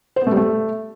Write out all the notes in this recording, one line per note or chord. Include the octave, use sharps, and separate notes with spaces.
C5
B3
A3
G3
A3